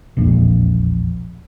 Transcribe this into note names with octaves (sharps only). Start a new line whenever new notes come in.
E1 A#1 F2